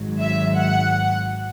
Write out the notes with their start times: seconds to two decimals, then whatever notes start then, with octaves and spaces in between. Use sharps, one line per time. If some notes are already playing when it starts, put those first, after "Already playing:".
Already playing: G#1 G#2 F#3
0.20 E5
0.57 F#5